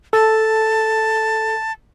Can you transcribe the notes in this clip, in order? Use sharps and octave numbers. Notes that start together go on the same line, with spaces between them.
A4 A5